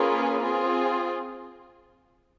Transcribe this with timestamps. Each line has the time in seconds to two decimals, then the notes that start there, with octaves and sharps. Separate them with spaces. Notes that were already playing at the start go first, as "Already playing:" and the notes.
Already playing: A#3 C#4 F4 G#4 B4
0.43 C4 F4 G#4